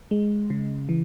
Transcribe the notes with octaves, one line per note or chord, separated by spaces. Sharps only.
G#3
C#3
E3